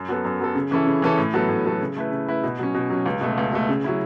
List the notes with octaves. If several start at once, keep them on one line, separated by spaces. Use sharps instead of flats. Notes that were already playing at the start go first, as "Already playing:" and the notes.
Already playing: F#2
F#3 B3 A4
F#2
F#3 B3 A4
C#3
E3 C#4 E4 A4
C#3
E3 C#4 E4 A4
A2
F#3 B3 A4
A2
F#3 B3 A4
C#3
A3 E4 B4
C#3
A3 E4 B4
B2
F#3 C#4
B2
F#3 C#4
C#2
B2 A3
C#2
B2 A3
C#3
F#3 C#4 E4